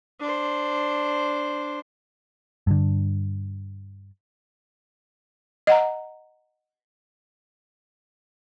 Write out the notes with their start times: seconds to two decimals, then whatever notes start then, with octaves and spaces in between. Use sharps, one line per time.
0.20 D4 C5
2.67 G2 D3
5.67 D#5 F#5 A#5